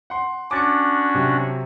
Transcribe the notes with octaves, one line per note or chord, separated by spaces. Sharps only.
F#5 C6
C#4 D4 F#4 D6 A6 C#7
C3 F#3